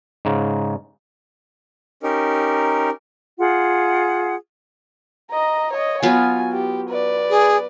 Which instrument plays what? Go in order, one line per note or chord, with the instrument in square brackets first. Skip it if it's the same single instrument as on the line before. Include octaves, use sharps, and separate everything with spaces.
[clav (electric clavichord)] G#2 C#3
[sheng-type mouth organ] C#4 D#4 G4 A#4
[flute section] F4 G#4 F#5
[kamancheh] D#5 A#5
C#5 D#5
[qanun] F#3 B3 F4 [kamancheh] G#5
[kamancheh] G4
B4 D5
[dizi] G#4